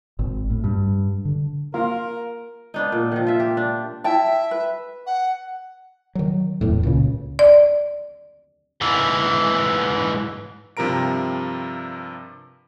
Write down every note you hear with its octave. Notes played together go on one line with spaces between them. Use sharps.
G#1
A2
G2
D3
A#3 F4 A#4 F5
B3 D4 D#4
A#2
D#3 F3
F4 E5
G4
D4
E4 E5 G5 A5
B4
F#5
D#3 F#3
D1 E2 A2
C#2 A#2 C#3
D5
G#2 E3
G2 C3 F3 A#4 A#5 D7